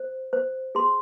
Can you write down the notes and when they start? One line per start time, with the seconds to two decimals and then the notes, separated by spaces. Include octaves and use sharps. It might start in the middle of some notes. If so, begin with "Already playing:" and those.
Already playing: C5
0.33 C5
0.75 G#4 C6